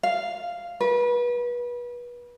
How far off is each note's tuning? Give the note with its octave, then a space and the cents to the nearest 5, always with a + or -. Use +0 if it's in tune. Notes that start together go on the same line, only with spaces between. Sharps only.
F5 -5
B4 -30